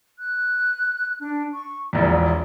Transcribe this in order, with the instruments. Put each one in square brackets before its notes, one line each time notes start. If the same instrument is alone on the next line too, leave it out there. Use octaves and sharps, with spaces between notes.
[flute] F#6
D4
C#6
[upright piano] E1 A#1 E2 [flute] F4